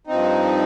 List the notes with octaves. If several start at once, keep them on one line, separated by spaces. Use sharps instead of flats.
G2 F3 C4 D#4